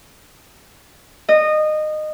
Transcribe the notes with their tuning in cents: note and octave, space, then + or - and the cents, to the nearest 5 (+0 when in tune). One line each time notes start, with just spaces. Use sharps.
D#5 -20